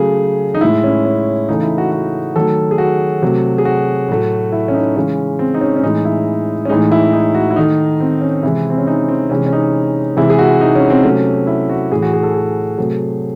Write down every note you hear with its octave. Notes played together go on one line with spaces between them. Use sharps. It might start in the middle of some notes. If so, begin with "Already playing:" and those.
Already playing: C#3 F#3 A3 G#4
D#4
A2 G#3 E4
C#4
C#4
C#3 E3 A3 D#4
E4
F#4
F#4
D#3 F#3 A3 A4
G#4
F#4
C3 F#3 A3
G#4
F#4
A2 F#3 A3
E4
C#4
D#4
C#3 E3 G#3 C#4
C4
D#4
C#4
C#4
A2 E3 G#3 D#4
E4
C#4
A2 E3 G#3 D#4
E4
D#4
F#4
E4
D#3 A3 D#4
C4
C#4
C3 E3 G#3 E4
C4
C#4
D#4
C4
C3 E3 G#3 C#4
C#4
D#4
C3 E3 G#3 E4
G#4
F#4
D#4
C#4
C4
C3 F#3 A3 C#4
E4
F#4
A2 E3 A3 G#4
F#4
G#4
A4
G#4
C3 F#3 A3